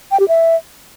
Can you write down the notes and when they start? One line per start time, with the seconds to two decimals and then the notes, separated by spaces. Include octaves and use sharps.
0.11 G5
0.20 G4
0.28 E5